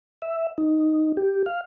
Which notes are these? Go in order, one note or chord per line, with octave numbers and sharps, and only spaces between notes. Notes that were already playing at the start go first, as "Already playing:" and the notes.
E5
D#4
G4
F5